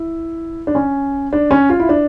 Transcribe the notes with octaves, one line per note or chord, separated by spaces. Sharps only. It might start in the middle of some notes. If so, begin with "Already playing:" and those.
Already playing: E4
D4
C#4
D4
C#4
F4
E4
D4